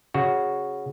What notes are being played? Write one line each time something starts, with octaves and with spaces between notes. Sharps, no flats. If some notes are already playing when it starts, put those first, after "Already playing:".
C#3 F#4